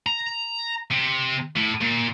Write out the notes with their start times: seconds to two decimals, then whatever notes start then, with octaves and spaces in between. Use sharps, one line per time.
0.06 A#5
0.91 C3
1.56 A2
1.81 A#2